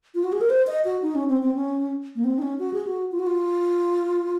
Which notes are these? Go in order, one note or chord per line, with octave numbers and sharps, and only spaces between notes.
F4
F#4
G#4
A#4
C5
D#5
F#4
D#4
C#4
C4
C4
C#4
A#3
C4
D#4
C#4
F#4
G#4
F#4
F4
F#4
F4